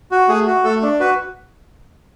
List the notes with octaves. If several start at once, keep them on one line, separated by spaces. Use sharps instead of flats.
F#4
A3 G#4
F#4
A3 A4
D4
F#4 B4